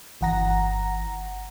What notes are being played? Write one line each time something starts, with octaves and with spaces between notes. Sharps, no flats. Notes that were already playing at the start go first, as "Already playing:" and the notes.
G1 E3 F#5 A#5 A#6